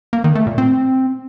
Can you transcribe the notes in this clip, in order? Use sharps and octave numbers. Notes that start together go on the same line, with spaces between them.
A#3
D#3
A3
A#2
C4